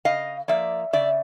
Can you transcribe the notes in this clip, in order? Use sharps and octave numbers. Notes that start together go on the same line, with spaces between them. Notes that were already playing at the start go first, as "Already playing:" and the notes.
C#3 D#5 F5
F3 A#3 D5 E5
C#3 D5 E5